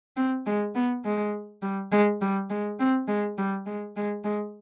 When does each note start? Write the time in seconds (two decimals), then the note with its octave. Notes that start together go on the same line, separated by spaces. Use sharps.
0.17 C4
0.46 G#3
0.75 B3
1.05 G#3
1.63 G3
1.92 G#3
2.22 G3
2.50 G#3
2.80 C4
3.08 G#3
3.38 G3
3.66 G#3
3.97 G#3
4.24 G#3